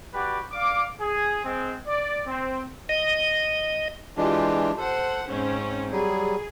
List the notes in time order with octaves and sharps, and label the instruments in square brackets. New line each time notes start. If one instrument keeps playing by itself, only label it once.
[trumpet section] F#4 G4 B4 D5
D5 F5 D6
G#4
G#3 C4
D5
C4
[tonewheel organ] D#5
[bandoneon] E3 G#3 D4 [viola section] F4 G4
[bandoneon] A4 [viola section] C5 F#5
[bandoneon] G#2 [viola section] C4 C#4
[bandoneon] F#3 G3 [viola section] G#4